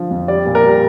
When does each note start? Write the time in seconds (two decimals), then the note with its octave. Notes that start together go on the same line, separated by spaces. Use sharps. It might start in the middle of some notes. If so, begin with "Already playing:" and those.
Already playing: D3 F3
0.11 F2
0.28 G3 D5
0.46 A#2
0.55 A#4
0.63 G3